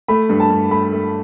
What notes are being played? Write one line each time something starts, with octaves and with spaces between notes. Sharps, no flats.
A3 B5
G2
A5
G2
A3 B5
A3